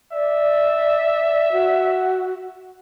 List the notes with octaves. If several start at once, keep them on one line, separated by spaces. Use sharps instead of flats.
D5 E5
F#4